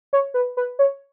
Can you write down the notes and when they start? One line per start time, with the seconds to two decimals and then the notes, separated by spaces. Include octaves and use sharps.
0.13 C#5
0.34 B4
0.57 B4
0.79 C#5